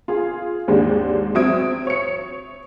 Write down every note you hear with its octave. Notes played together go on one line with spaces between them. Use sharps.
F4 G#4
G#1 D#2 G#2 G#3 D4 G4
F#3 C4 E5 D#6 G#6 D7
C#5 C#7